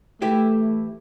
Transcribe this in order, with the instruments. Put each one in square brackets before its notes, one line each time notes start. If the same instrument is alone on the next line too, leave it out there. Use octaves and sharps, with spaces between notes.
[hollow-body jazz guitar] E3 E4 G4 [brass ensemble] A3